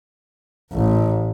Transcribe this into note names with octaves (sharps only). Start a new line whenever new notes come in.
A1